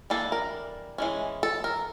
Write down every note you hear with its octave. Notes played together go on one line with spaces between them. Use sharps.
E3 G3 A#3 D4 A4
A#4
E3 G#3 C#4
A4
A#4